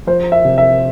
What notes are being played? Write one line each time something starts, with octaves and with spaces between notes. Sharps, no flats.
F3 C5
E5
C3
E5